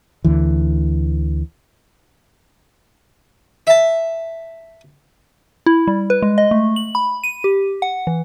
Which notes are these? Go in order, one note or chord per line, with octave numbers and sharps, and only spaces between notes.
D2 D3 E3
E5 A5
E4
G3
B4
G#3
D#5
A3
F#7
B5
D#7
G4
F#5
E3